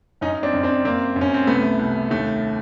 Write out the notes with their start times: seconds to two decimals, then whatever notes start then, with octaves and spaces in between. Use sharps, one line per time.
0.21 F#2 C#4 D#4
0.43 C4 D4
0.54 F#2
0.63 C4 D4
0.85 F#2 A#3 C4
1.16 F#2
1.21 C#4
1.34 C4
1.47 C2 A3 B3
1.79 C2
2.10 D#2 A3